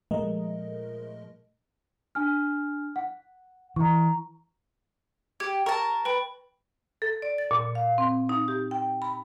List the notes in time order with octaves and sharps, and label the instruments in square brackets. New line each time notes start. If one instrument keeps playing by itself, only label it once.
[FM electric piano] A#2 F3 G#3 A3 A#4 D#5
[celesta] D4 G#5 F6
F#5
[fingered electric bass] E3 [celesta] A#5 C#6
[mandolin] G4 [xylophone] G#6
[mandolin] A#4 A5 [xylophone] C#6
[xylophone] B4 G5 B5
[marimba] A4
D5
A6
A#2
F5
C4
D#4
G4
G5
B5